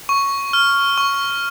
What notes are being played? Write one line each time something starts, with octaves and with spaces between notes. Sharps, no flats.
C#6
F6
C#6